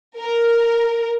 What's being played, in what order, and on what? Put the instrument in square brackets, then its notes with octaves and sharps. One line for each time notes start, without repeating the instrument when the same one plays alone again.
[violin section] A#4